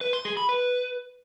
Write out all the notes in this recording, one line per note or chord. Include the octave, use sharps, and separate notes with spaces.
B4
C6
G#4
B5
B4